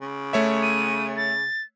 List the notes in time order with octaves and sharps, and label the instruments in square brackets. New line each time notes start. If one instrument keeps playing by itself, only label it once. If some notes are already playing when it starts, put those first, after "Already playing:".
[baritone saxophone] C#3
[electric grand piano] A3 C#5 E5
[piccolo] D#7
A6